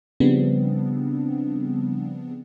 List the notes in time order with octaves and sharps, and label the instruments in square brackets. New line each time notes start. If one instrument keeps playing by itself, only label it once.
[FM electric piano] C#3 F3 G3 B3 C4 D4